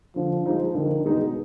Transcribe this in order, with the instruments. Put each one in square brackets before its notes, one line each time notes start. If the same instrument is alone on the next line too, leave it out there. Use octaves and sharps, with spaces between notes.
[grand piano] D3 [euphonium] F3
[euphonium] F3 [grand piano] G#3 D#4
[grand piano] D3 [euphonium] D#3
[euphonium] B2 [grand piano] G#3 D#4